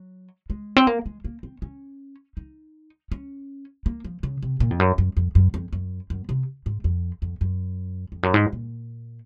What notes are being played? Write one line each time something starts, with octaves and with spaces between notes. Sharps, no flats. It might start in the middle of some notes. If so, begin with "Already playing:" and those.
Already playing: F#3
G#3
C4
A#3
G#3
A#3
C4
C#4
D#4
C#4
A#3
F3
C#3
C3
A#2
F2
F#2
F#2
F2
F#2
F2
F#2
F#2
C3
G#2
F2
F2
F#2
F2
F#2
G#2
A#2